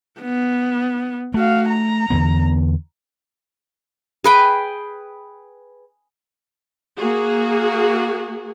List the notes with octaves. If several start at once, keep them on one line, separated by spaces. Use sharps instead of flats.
B3
A3 F#4 F5
A#5
E2 D3 B3
G#4 B4 G5
A#3 F#4 G#4